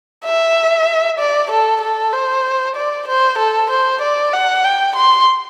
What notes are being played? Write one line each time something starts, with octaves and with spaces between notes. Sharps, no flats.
E5
D5
A4
A4
C5
D5
C5
A4
C5
D5
F#5
G5
C6